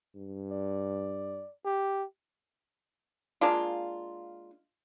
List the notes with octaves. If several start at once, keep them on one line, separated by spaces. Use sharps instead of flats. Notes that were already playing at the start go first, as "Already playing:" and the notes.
G2
D5
G4
G#3 A#3 D4 F4